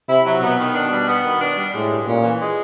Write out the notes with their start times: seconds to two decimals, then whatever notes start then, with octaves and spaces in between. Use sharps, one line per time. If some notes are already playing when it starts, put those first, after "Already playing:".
0.09 C3 E4
0.26 F#3
0.42 B2 B3
0.58 D#3
0.75 D4
0.91 G3
1.08 B3
1.24 D#3
1.41 D4
1.58 G3
1.73 A2 G#3
1.90 G2
2.07 A#2 C#4
2.24 E3
2.41 G#3